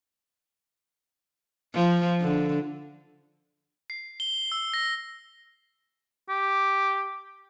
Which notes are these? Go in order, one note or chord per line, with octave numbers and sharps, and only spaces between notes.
F3
D3
C7
G7
E6
A#6
G4